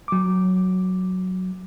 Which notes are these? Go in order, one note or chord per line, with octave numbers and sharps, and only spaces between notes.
F#3 D6